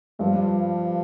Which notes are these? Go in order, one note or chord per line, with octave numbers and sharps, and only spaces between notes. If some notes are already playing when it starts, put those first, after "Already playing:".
G2 F3 G3 F4